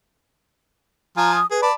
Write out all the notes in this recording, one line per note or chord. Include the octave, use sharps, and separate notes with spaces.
F3 F4 G#5 A#5
D#6
G#4 B4
D5 A5 B5